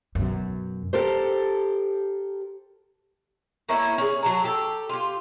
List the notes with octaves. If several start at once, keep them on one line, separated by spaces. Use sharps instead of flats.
F#2 B2
G4 A4 A#4 C5
A3 A#3 C#4 E4
C#4 G#4
F#3 A5 A#5
G4 A4
F4 G4